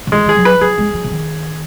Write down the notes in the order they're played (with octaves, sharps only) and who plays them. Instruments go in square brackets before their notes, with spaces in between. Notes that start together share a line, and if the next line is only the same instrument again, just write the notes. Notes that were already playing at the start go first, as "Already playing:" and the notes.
[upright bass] C#3
[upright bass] D#3 [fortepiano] G#3
[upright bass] D#3 [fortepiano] G#4
[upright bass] F#3
[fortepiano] B4
[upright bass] F#3 [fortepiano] G#4
[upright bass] G#3
F#3
C#3
D#3